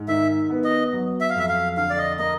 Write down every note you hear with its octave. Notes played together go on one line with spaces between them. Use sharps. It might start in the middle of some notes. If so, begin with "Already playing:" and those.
Already playing: G#2
D#3 E5
B3
D#5
F#3
E5
F5
F2 E5
F5
D3 F5
D5
D#5
A#3 D#5